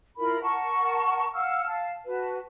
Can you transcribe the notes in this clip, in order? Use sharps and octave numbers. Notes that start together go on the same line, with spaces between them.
E4 F4 A#4 B5
A#4 F#5 A5 C#6
F5 F#5 E6 F6
F5 A5
F#4 B4 A5